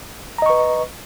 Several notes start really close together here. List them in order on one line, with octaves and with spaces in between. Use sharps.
A#5 D#5 C#6 B4